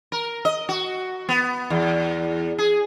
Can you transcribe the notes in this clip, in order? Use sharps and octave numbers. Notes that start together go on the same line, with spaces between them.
A#4
D#5
F#4
B3
E2
G#4